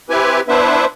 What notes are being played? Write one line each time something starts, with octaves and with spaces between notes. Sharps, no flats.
C4 E4 G4 B4 G#5
B3 D4 E4 B4 C5 E5